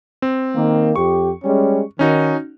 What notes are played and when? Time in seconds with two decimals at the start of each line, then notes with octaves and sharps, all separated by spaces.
0.22 C4
0.55 D#3 A#3
0.96 F2 G4 C#6
1.44 G3 G#3 C#4
1.99 D#3 C#4 D#4 F#4